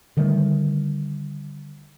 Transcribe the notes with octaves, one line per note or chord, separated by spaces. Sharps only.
D3 D#3 G3 A3